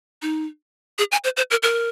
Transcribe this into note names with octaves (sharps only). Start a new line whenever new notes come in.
D#4
G#4
G#5
C5
C5
A#4
A#4